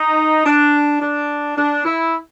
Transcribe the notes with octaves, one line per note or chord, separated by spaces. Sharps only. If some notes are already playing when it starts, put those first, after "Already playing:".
Already playing: D#4
D4
D4
D4
E4